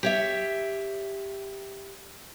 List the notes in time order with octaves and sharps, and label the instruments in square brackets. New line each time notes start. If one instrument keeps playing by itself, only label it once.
[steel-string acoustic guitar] G4 C#5 E5